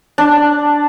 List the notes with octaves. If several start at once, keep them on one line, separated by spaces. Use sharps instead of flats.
D4